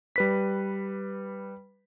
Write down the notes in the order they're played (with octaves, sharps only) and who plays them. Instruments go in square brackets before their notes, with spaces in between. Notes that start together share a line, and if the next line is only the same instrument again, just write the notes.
[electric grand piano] G3 B4 B6